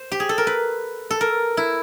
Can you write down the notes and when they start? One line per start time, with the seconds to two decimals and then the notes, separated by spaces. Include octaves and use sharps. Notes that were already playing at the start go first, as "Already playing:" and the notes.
Already playing: C5
0.12 G4
0.20 G#4
0.29 A4
0.38 A#4
0.47 B4
1.11 A4
1.21 A#4
1.57 E4